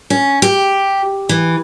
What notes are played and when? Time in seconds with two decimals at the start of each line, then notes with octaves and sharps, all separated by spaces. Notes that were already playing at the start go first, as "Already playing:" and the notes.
0.10 C#4
0.42 G4
1.29 E3